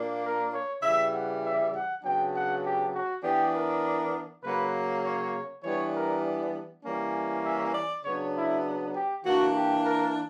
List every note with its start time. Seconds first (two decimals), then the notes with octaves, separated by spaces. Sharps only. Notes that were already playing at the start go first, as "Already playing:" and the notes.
Already playing: A#2 A#3 D4
0.23 A#4
0.53 C#5
0.82 C#3 E3 G3 E5
1.12 F#5
1.43 E5
1.73 F#5
2.03 C#3 F#3 B3 D4 G5
2.33 F#5
2.63 G4
2.93 F#4
3.23 E3 B3 D4 G4
3.53 A#4
4.43 C#3 F#3 A#3 B4
5.03 C#5
5.63 E3 G3 B3 D4 C#5
5.93 A#4
6.84 E3 G3 A#3 C#4
7.43 E5
7.74 D5
8.04 C#3 F#3 B3 D4 C#5
8.34 E4
8.93 G4
9.24 E3 A#3 D4 F#4
9.54 G4
9.84 A#4